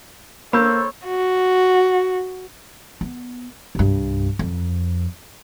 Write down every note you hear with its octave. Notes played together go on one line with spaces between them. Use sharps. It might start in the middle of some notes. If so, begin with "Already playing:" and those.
A#3 A4 C5 C#5 B5 E6 G6
F#4
B3
C2 G2
F2